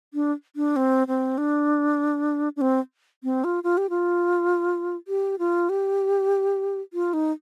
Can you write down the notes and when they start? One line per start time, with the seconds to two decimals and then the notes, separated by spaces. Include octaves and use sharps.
0.14 D4
0.56 D4
0.76 C4
1.08 C4
1.38 D4
2.56 D4
2.61 C4
3.24 C4
3.44 F4
3.64 F4
3.77 G4
3.90 F4
5.08 G4
5.39 F4
5.69 G4
6.93 F4
7.13 D#4